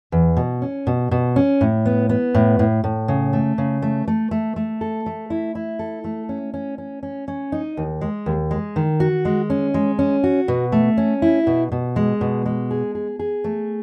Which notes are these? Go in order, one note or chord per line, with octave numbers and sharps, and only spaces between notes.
E2
B2
C#4
B2
B2
C#4
A2
B3
B3
A2
A2
A2
C#3
A3
C#3
A3
A3
A3
A3
A4
A3
E4
E4
A4
A3
C#4
C#4
C#4
C#4
C#4
D#4
D#2
G#3
D#2
G#3
D#3
F#4
G#3
C#4
G#3
C#4
F#4
B2
A3
C#4
E4
B2
B2
G#3
B2
G#3
G#4
G#4
G#4
A3